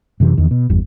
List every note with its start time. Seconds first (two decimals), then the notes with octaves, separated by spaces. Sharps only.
0.20 F#2 C3 E3
0.38 E2 D#3
0.51 B2
0.70 G1 E2 G2